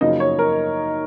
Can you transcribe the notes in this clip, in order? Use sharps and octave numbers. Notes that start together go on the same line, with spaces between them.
F#2 C#3 F3 A#3 D#4 D#5
C#5
A#4